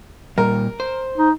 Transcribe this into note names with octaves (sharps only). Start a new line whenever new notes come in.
A#2 G3 A#4
C5
D#4